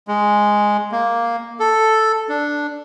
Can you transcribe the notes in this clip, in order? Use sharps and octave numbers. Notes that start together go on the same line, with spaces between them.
G#3
A#3
A4
D4